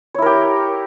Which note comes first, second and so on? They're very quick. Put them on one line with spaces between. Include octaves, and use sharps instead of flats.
C#5 E4 A#4 G4